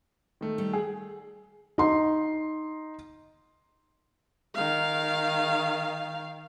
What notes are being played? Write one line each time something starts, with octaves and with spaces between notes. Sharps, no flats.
D#3 A3
G3
G#4
D#4 C6
D#3 F5